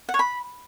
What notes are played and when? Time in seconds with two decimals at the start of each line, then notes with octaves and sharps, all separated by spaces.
0.09 F#5
0.14 C#5
0.19 B5